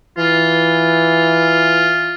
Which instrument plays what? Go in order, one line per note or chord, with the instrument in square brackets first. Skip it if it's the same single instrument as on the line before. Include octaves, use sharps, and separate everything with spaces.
[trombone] E3 [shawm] F4